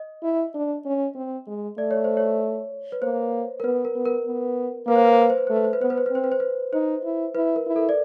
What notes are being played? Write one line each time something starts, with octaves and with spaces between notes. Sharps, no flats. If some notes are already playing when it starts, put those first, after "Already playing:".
Already playing: D#5
E4
D4
C#4
C4
G#3
A3 D5
C#5
C5
C#5
B4
A#3 C5
A#4
B3 B4
A#4
B3
A#4
B3
A#3 B4
C5
B4
C5
B4
C5
B4
A3 C5
B4
C5
B4
B3 C5
B4
C5
B4
C4 C5
B4
C5
B4
D#4 C5
E4
E4 B4
A#4
E4
A4
D5